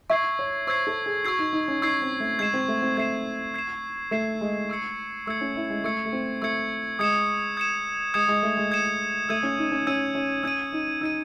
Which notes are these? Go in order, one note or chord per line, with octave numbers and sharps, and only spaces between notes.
E5 C#6 E6 G#6 C7
C#5
C5 C#6 E6 G#6 C7
A4
G#4
F#4 C#6 E6 G#6 C7
D#4
D#4
C#4
D#4 C#6 E6 G#6 C7
C4
A3
G#3 G#6 C7 E7
C4
A3
C4
A3 G#6 C7 E7
G#6 C7 E7
A3 G#6 C7 E7
G#3
C#6 E6 G#6 C#7
A3 C#6 E6 G#6 C#7
C#4
E4
G#3
A3 C#6 E6 G#6 C#7
A3
C4
A3 C#6 E6 G#6 C#7
G#3 D#6 G#6 C#7 E7
D#6 G#6 C#7 E7
G#3 D#6 G#6 C#7 E7
G#3
A3
G#3
D#6 G#6 C#7 E7
A3 E6 G#6 D#7
C#4
D#4
C#4
C#4 E6 G#6 D#7
C#4
C#4 E6 G#6 D#7
D#4
D#4 E6 G#6 D#7